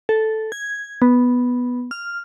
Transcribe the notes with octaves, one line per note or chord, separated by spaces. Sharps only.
A4
G#6
B3
F6